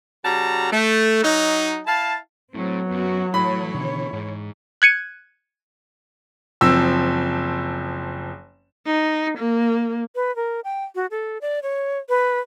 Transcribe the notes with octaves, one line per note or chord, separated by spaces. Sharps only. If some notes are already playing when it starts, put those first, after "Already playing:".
C#3 G3 F#4 A5 A#5
A3
F#3 D#4
E4 F5 A5
A2 F#3 C4
F#2 B3 F#4
A2 E3 C#5 B5
B2 D3 D#3
G#2
F#6 G#6 C#7 D#7
F#1 F3 C4 E6
D#4
A#3
B4
A#4
G5
F#4
A4
D5
C#5
B4